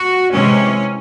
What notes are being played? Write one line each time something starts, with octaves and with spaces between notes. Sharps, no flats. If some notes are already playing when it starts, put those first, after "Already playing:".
Already playing: F#4
C3 E3 G#3 C#4